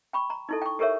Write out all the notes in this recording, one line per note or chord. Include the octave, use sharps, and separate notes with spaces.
G5 B5 C#6
A#5
D#4 E4 A4
G5 C#6
G4 A4 A#4 C#5 E5